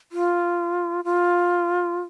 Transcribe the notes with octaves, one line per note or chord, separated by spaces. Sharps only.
F4
F4